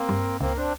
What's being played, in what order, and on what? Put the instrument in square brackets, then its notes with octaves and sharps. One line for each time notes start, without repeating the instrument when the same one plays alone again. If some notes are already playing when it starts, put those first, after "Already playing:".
Already playing: [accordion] A#3 C4
[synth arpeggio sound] G2
[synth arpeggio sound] C#2 [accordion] A#3 C4
[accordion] C4 D4